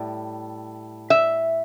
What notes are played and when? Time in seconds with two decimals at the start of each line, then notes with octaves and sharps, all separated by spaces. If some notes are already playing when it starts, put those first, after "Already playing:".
Already playing: A2 G3
1.10 E5